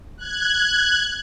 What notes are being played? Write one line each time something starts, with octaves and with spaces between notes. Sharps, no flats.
F#6 G#6